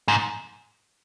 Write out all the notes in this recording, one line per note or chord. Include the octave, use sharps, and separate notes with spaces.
G#2